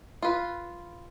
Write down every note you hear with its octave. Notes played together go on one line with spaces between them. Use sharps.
F4 B4